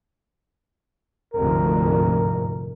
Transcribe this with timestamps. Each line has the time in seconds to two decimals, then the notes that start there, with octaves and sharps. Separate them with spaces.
1.34 F1 D2 G#2 A#4